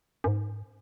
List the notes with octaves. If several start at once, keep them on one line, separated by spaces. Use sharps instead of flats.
F#2
G#2